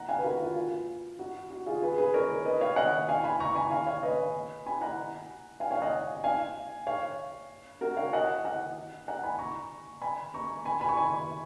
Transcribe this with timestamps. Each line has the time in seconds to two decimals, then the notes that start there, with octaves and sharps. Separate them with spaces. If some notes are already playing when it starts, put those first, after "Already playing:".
Already playing: F#5 A#5
0.09 F5 G#5
0.18 B4
0.24 F#4 A#4
0.40 F4
0.56 F4
1.19 F#4
1.50 F#4
1.66 F4 G#4
1.82 G#4 B4
1.98 G#4 B4
2.14 A#4 C#5
2.45 B4 D#5
2.61 C#5 F5
2.76 D#5 F#5
3.08 F5 G#5
3.24 G#5 B5
3.40 A#5 C#6
3.55 G#5 B5
3.71 F5 G#5
3.86 C#5 F5
4.03 B4 D#5
4.66 G#5 B5
4.81 F#5 A#5
5.60 F5 G#5
5.71 C#5 F5
5.82 D#5 F#5
6.24 F5 G#5
6.87 C#5 F5
7.81 F#4 A#4
7.97 C#5 F5
8.13 D#5 F#5
8.44 D#5 F#5
9.07 F#5 A#5
9.23 G#5 B5
9.39 A#5 C#6
10.02 G#5 B5
10.34 A#5 C#6
10.65 G#5 B5
10.81 G#5 B5
10.89 C#6
10.97 G#5 B5